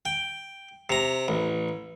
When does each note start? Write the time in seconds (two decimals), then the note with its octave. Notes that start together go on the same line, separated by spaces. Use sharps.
0.06 G5
0.90 C3 A#5
1.28 A1